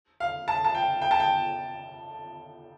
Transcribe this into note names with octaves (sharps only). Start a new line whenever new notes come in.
F5
A5
A5
G5
G5
A5
G5